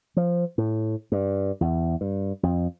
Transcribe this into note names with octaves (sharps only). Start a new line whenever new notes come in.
F3
A2
G2
E2
G2
F2